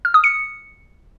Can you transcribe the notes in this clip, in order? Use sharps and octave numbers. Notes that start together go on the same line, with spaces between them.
F6
D#6
C#7